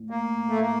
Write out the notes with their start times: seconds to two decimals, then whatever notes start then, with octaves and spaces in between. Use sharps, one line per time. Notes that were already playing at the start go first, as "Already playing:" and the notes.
Already playing: A2
0.10 A#3
0.49 A3
0.61 A#3